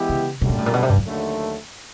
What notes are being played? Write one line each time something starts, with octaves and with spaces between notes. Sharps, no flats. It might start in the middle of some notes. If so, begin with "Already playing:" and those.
Already playing: E3 G#3 B3 E4 G4
C#3
F#2 B2 D3 G3
A#2
A2
A#2
B2
C3
G2
F#2
D#2 D3 F#3 A3